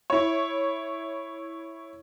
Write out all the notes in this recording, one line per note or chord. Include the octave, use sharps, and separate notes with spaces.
E4 C#5